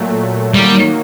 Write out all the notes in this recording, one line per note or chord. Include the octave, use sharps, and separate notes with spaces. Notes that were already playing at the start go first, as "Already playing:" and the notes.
Already playing: A#2 F#3 A3
D#3 F#3 G3 A#3